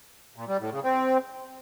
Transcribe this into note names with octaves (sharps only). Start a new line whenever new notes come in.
A#2
G3
A2
C#3
C4